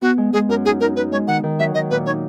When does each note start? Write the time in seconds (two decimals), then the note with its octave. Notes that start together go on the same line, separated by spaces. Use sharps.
0.02 B3 F#4
0.18 G#3
0.33 G#3 G#4
0.49 F#2 A#4
0.65 D#4 G#4
0.80 D#4 A#4
0.96 D#4 B4
1.12 G#3 C#5
1.28 D#3 F#5
1.43 D#3
1.59 F#3 E5
1.74 D#3 D#5
1.91 A#2 B4
2.06 D#4 C#5